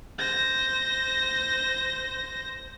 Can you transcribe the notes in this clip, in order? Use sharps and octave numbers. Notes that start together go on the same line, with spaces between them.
C5 A#6